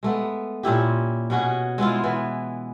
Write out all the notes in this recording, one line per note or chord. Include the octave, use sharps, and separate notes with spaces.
G#3 A3 B3
A#2 C#4 E4 G4
B2 C#4 F#4 G#4
G#3 B3 E4 F4
E3 B3